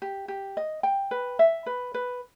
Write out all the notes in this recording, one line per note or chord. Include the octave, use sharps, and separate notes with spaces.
G4
G4
D#5
G5
B4
E5
B4
B4